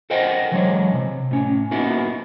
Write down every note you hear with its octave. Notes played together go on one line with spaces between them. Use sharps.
A4 A#4 C5 D#5 F#5 G5
E3 F#3 G#3 D4 C#5
C3
A2 C#4
A#3 B3 D#4 E4 F#4 A#4